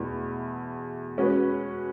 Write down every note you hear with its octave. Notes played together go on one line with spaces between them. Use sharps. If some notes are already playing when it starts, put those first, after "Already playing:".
Already playing: E2 B2 A3 E4
G#3 C#4 F#4 B4